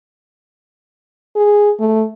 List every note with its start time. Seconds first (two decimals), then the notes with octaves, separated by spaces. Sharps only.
1.36 G#4
1.80 A3